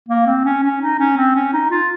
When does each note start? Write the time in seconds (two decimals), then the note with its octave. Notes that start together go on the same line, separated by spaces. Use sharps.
0.09 A#3
0.26 C4
0.45 C#4
0.63 C#4
0.82 D#4
0.99 C#4
1.17 C4
1.35 C#4
1.53 D#4
1.71 F4